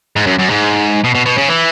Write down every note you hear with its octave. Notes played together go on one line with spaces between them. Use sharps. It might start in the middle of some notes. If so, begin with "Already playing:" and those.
G#2
F#2
F#2
G#2
B2
B2
B2
C#3
E3